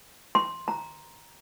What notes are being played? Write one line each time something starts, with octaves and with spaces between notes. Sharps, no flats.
C6
A#5